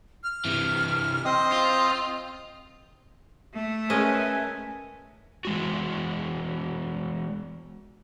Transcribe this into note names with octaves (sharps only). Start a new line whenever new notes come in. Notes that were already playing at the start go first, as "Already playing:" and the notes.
F6
C3 E3
C4 C5 D#5 D#6
F4
A3
G#3 C#4 A#4 B4 D#5 G#5
E3 G#3 F#4